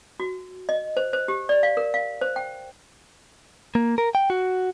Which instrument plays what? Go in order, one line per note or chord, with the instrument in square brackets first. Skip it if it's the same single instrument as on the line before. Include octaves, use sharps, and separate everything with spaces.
[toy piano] F#4
D#5
C5
C5
G4
D5
F5
A#4
F5
C5
G5
[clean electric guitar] A#3
A#4
G5
F#4